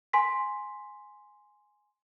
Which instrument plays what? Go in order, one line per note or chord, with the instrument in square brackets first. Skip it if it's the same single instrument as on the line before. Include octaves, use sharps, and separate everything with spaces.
[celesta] G#5 C6 B6